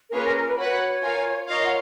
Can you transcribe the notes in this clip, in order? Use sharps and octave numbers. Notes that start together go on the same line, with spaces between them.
A#4
A#3 C#4 F4 G#4 B4 C#5
A#4
A#4
B4
F#4 B4 C#5 F#5
F4 A#4 F5 G#5
F4 A#4 C#5 D#5 F5
F#5